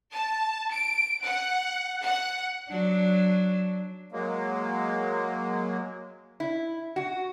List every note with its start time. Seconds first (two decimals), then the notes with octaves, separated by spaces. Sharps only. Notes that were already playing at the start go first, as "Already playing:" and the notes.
0.14 A5
0.72 D7
1.25 F#5
2.04 F#5
2.69 F#3 D4
4.12 F#3 G#3 A#3
6.40 E4
6.96 F#4